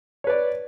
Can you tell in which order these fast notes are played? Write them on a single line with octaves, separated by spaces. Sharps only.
C#5 B4 D5